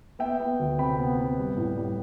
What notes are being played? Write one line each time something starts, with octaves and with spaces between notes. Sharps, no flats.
B3 E5 G5
B3
D2
C3 G5 B5
B3
B3
G3
A2
G3